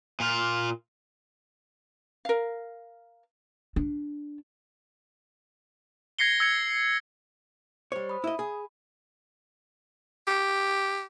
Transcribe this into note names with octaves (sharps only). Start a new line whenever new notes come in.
A#2 F4
A#4 F5
D4
G#6 A#6 C7 C#7 G7
E6 G#6 C#7
G3 C5 C#5
B5 D#6
E4 D#5
G#4
G4